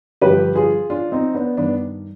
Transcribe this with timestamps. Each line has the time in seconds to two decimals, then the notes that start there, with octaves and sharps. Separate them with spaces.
0.21 G2 D3 F3 G4 B4
0.55 F4 G#4
0.90 D4 F4
1.12 C4 D#4
1.35 B3 D4
1.57 G2 D#3 B3 D4